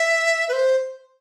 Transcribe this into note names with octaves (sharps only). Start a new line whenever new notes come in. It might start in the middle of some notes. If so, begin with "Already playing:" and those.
Already playing: E5
B4
C5